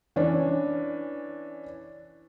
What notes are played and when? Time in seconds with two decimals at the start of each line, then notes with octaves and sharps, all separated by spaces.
0.16 E3 C#4 D4